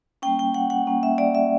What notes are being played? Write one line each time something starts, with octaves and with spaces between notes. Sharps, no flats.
G3 A#3 C#4 G5
G5
F#5
F#5
G3 A#3 C#4
E5
D5
E5